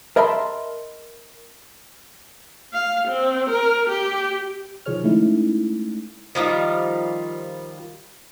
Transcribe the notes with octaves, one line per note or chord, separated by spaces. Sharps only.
A#4 D#5 E5 A5 B5 C6
F5
C4
A#4
G4
C3 D#3 F3 G#4 C#5 F6
G#3 A3 C#4 D#4 E4
D#3 F3 G3 F4